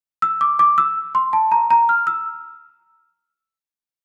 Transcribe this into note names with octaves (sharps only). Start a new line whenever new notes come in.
E6
D6
D6
E6
C6
A5
A#5
A#5
F6
E6